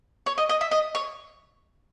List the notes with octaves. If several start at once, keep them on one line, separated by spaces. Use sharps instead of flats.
C#5
D#5
D#5
E5
D#5
C#5